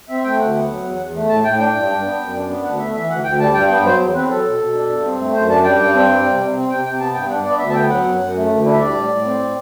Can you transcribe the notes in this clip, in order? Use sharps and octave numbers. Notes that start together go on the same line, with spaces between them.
C4 E5
A3 G5
D2 F#5
B3
F#3
E2
E2
A3
A2 A5
A2 G5
D4 G5
G2
D4
B3
F#2
D4
B3
D2 F#5
A3 E5
E3 E5
D2 F#5
D2 G5
G3 A5
G2 G5
B3 G5
F#3 C5
E2
C4 B4
F#3 A4
B2
B2
D4
G2
C4
A3
F#2 C5
D4 A5
G3 G5
G2
C4
G3
C3
C3
C4
C3 G5
C3 G5
B3 A5
G2 G5
D4 F#5
B3 D5
D2 E5
A5
B3 G5
F#3 F#5
F#2
F#2
A3
D2
D4 E4
E5
G3 D5
A2
A2
C4
A2